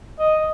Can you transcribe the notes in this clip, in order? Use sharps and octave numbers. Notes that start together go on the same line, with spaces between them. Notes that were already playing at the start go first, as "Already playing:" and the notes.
D#5